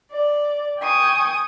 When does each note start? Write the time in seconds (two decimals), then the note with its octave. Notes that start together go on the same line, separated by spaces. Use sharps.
0.10 D5
0.80 G5 G#5 C#6 D#6